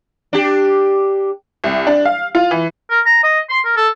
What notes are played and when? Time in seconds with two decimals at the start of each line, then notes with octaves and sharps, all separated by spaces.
0.33 D4 G4
1.64 C2
1.87 D4
2.05 F5
2.35 F4
2.51 E3
2.90 A#4
3.05 A#5
3.23 D#5
3.49 C6
3.65 A#4
3.76 A4